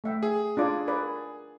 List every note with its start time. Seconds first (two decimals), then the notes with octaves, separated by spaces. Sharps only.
0.04 A3 E5 G5
0.23 G#4
0.57 D4 F4 D5
0.88 A#4 B4 D5